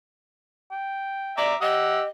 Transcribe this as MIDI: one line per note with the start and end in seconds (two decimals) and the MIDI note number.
0.71 1.38 79
1.38 1.55 74
1.38 1.55 76
1.38 1.55 82
1.38 1.55 86
1.61 2.05 67
1.61 2.08 75
1.61 2.00 78
1.61 2.00 88